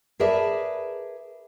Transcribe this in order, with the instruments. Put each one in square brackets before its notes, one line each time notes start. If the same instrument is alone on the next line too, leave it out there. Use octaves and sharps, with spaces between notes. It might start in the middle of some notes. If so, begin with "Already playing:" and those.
[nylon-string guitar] G#4 A#4 B4 D5 E5 A5